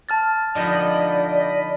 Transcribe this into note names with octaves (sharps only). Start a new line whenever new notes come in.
A5 F6 A6
D3 F3 D#4 D5 D#5 B5